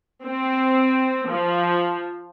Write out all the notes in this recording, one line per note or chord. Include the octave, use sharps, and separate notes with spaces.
C4
F3